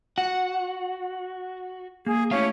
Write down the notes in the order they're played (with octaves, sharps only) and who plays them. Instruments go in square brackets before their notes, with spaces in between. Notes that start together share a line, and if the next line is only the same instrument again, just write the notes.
[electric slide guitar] F#4 [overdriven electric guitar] F#5
[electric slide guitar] A#3 [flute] G#4
[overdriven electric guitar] A3 [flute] C#4 [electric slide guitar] E4 G4 F5